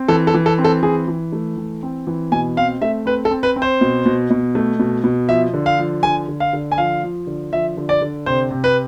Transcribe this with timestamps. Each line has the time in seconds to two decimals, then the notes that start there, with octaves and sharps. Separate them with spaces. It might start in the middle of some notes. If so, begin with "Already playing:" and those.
Already playing: C4
0.08 E3 A4
0.27 A4
0.34 E3
0.46 A4
0.58 C4
0.64 A4
0.83 E3 G#4
1.08 E3
1.32 A3
1.58 E3
1.83 C4
2.07 E3
2.32 B2 G#5
2.57 C4 F5
2.81 A3 E5
3.06 C4 B4
3.25 A4
3.31 C4
3.43 B4
3.56 C4
3.62 C5
3.81 B2
4.06 B2
4.30 B2
4.55 A3
4.80 B2
5.04 B2
5.29 F3 E5
5.54 D3
5.66 F5
5.79 F3
6.03 D3 G#5
6.28 D3
6.40 F5
6.53 D3
6.72 G#5
6.78 F3 F5
7.03 F3
7.27 D3
7.53 F3 E5
7.77 D3
7.89 D5
8.01 D3
8.26 C3 C5
8.51 C3
8.64 B4